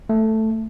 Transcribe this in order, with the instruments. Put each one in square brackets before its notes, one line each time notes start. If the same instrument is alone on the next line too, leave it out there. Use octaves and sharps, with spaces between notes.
[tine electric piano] A3